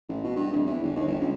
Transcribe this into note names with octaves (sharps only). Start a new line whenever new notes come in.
A1
B2
G2
D1
E2
G1
D#2
G1
C#2